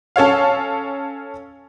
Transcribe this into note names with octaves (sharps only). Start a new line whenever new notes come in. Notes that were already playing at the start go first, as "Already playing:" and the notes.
C#4 A4 C#5 F5